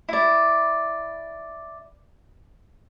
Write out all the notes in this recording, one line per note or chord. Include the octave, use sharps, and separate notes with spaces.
E4 D5